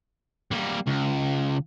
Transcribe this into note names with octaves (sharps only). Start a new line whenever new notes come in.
G3 A#3
C#2